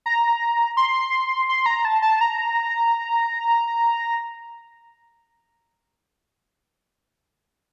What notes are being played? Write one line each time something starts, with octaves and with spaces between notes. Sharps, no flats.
A#5
C6
C6
A#5
A5
A5
A#5